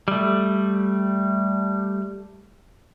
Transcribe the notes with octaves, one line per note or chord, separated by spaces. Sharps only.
G3 A3